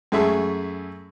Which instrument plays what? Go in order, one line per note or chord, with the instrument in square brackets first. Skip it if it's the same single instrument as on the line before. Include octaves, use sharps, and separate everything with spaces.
[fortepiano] F#2 A3 G#4 E5 C#6 E6